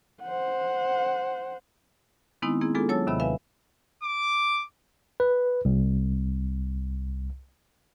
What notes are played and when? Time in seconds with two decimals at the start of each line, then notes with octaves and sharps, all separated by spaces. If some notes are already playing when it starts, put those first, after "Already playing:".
0.23 C5 F#5
2.42 D#3 G#3 B3 C4 D#4 E4
2.61 A#3 C4 E4 G#4
2.75 G#3 B3 D4 F4 G#4 A4
2.89 F#3 C#5 A5 E6 A6
3.07 D#2 C3 D#3 E5 B5 E6
3.20 B4 E5 F5 G#5
4.03 D6
5.20 B4
5.65 C2